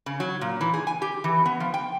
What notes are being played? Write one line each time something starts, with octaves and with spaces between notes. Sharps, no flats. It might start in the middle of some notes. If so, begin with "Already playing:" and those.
C#3
F#3
A#2
E3
G#4
G#5
G4
E3
B3
F3
G5